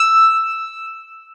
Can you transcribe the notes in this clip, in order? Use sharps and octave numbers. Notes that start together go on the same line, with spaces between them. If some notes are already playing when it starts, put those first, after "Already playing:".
Already playing: E6